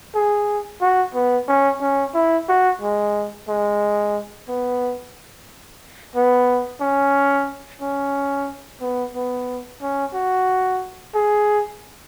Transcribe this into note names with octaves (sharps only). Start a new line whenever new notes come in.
G#4
F#4
B3
C#4
C#4
E4
F#4
G#3
G#3
B3
B3
C#4
C#4
B3
B3
C#4
F#4
G#4